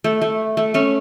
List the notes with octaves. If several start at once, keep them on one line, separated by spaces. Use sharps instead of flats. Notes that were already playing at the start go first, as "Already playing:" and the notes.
A3
A3
A3
A3 C#4